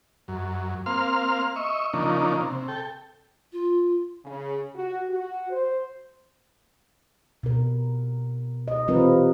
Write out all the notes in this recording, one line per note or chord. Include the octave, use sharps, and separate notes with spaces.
F#2
A#3 C4 F5 C6 F6
D#5 E5 C#6
C#3 F3 A#3 D4 D#4
C3
A4 G5
F4
C#3
F#4
F#4
C5
B2 A#4
D#5
E3 G3 C4 F4 A#4 B4